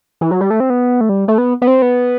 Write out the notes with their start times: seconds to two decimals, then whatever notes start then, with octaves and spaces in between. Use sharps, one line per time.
0.21 E3
0.31 F#3
0.41 G3
0.50 A3
0.60 C4
0.70 B3
1.01 A3
1.09 G3
1.28 A3
1.38 B3
1.62 B3
1.67 C4
1.82 B3